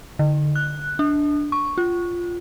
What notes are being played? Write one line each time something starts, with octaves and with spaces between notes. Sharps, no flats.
D3
F#6
D4
C#6
F4